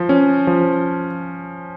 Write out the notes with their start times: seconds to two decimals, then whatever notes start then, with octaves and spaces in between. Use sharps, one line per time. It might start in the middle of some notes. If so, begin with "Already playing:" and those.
Already playing: F3
0.09 C#4
0.47 F3